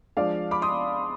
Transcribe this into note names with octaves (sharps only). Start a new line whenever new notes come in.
F3 G#3 D4 D5 F5
B5 D6
C6 D#6